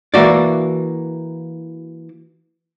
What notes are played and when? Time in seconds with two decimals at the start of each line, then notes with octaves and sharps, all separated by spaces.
0.14 E3 A#3 F#4 D5